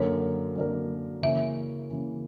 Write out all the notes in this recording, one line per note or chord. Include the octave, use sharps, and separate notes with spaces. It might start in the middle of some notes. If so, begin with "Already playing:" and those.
Already playing: F#2 D3 A#3 D4 A#4 C#5
F#2 D3 A#3 D4 A#4
C#3 E3 A#3 C#4 E5
C#3 E3 A#3 C#4